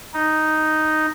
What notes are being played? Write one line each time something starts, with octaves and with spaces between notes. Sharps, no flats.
D#4